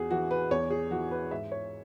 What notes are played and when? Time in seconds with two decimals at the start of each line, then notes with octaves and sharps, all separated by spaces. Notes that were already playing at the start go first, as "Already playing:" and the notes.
Already playing: E2 E3 F#4 G#4
0.11 E3 F#4
0.31 B4
0.51 E2 C#5
0.70 G#4
0.91 E3 F#4
1.11 B4
1.31 G#2 E5
1.52 C#5